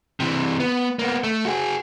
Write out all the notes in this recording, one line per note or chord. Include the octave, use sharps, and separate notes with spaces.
C3 E3
B3
A#3 B3
A3
F#4 G#4